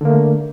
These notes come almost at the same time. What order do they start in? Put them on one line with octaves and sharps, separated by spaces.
D3 A#3 A3